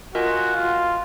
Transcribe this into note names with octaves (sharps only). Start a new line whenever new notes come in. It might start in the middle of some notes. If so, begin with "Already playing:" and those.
F4 F#4 A#4 D#5 G#5
F4